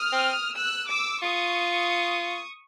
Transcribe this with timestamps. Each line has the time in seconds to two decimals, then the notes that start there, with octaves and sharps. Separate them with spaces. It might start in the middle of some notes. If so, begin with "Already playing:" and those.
Already playing: D#6 F6
0.12 C4
0.56 E6 F#6
0.89 D6 E6
1.22 F4 C#6 D#6